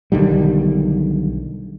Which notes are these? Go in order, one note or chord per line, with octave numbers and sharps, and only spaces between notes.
B1 D3 D#3 G3